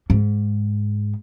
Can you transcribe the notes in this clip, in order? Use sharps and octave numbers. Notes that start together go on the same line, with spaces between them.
G#2